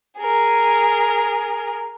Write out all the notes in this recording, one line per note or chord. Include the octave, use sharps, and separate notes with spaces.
G#4 A#4